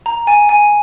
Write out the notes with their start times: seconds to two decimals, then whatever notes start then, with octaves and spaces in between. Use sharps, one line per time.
0.06 A#5
0.27 G#5
0.49 G#5